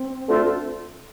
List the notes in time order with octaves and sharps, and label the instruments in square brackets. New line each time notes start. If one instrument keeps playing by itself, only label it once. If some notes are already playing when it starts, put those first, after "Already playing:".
Already playing: [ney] C4
[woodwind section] D2 D3 A3 F4 A4